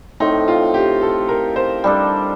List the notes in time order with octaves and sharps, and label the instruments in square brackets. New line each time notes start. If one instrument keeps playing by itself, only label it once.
[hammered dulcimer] A2 A3 C4 [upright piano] D#4
[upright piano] F4
G4
A4
A#4
C5
[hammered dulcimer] G3 D4 A4